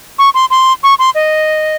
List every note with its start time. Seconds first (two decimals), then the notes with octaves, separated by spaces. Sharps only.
0.19 C#6
0.34 C6
0.50 C6
0.83 C#6
0.99 C6
1.15 D#5